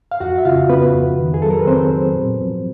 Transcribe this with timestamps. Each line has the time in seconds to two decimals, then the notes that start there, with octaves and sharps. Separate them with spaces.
0.12 F5
0.20 F2 F#4 F#5
0.38 E5
0.45 C#3 F4 F5
0.69 C#3 B3 B4
0.94 F2
1.18 D#3
1.34 G#4
1.42 F#3 A4
1.50 A#4
1.59 B4
1.67 D#3 C4 C5
1.92 F#3
2.16 A#2
2.41 F3